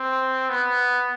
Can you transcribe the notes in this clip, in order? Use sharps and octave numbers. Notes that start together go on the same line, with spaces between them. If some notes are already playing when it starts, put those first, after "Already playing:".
Already playing: C4
B3